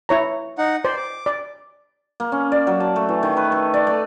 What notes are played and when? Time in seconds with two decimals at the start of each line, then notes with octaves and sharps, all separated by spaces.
0.09 E4 C#5 A#5
0.58 D#4 F#5
0.85 C5 D5
0.97 D6
1.26 D5
2.20 A#3
2.32 C#4
2.52 D5
2.67 F#3
2.80 A5
2.96 A3
3.09 E3
3.23 D#3
3.37 B4
3.52 A4
3.74 D5
3.87 A3